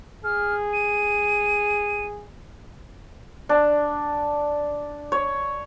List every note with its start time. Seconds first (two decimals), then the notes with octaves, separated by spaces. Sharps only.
0.24 G#4 F6
0.73 D#7
3.49 D4
5.12 C#5